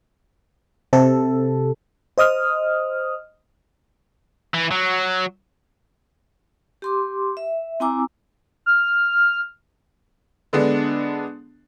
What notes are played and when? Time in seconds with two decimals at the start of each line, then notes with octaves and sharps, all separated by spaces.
0.93 C3 A4
2.18 C5 D#5 D#6 F6
4.54 E3
4.71 F#3
6.82 G4 C6 D6
7.37 E5
7.80 C4 E4 G#5 A#5 D6 E6
8.66 F6
10.53 D3 G#3 B3 D4